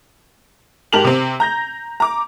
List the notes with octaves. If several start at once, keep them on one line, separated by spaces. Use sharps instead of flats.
G#2 G4 A#4 A5 F7 F#7
C3 C4
A#5 G6 A#6
A#5 D6